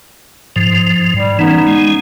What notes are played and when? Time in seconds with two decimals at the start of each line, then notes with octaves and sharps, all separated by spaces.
0.56 G#2 F3
1.16 G3
1.39 E3 B3 C#4 D#4
1.67 G#3